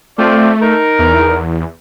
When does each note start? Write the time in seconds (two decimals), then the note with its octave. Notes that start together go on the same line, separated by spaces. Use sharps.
0.18 A3 C4 F4 D5
0.62 D#4 A#4
0.99 E2